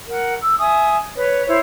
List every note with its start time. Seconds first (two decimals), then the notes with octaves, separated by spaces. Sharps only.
0.08 A#4 F#5
0.42 E6
0.59 E5 G#5 D#6
1.15 B4 C#5
1.47 E4 C5 C#5